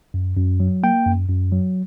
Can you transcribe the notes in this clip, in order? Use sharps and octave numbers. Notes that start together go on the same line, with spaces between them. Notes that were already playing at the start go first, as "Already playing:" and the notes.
F#2
F#2
F#3
A#3 G5
F#2
F#2
F#3